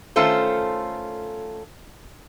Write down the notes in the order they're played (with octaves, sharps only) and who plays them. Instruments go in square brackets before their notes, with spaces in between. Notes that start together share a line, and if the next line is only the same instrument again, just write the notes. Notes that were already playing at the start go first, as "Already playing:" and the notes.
[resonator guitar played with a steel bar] D#3 A3 C#4 F4 A4 C5